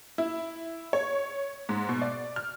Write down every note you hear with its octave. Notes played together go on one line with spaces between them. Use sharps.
E4
C#5
G#2
B2
D5
F6